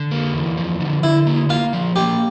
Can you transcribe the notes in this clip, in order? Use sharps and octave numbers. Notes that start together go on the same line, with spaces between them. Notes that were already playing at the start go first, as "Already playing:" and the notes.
Already playing: D3
A#3
E2
F3
D3
D3 E4
A#3
A#3 F4
F3
A#3 G4